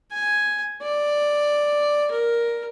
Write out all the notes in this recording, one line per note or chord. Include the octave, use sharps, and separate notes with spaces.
G#5
D5
A#4